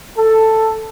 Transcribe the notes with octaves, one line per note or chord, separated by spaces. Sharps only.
A4